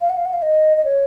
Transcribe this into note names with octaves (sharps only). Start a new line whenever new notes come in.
F5
F#5
F5
F#5
F5
D#5
D#5
C#5